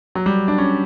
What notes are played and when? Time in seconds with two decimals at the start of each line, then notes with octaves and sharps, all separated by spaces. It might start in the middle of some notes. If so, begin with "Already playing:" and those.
0.15 F#3
0.26 G3
0.48 D4
0.58 C#4